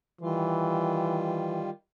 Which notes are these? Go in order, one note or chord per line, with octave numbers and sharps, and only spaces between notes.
D#3 E3 G3 F4